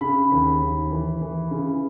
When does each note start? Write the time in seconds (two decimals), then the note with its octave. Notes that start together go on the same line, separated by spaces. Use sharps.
0.01 C#3 B5
0.32 D#2
0.61 D#2
0.91 E3
1.21 E3
1.51 C#3